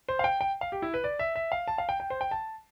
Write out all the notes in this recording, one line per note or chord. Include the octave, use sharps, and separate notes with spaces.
C5
F5
G5
G5
F5
G4
E4
B4
D5
E5
E5
F5
A5
F5
G5
G5
C5
G5
A5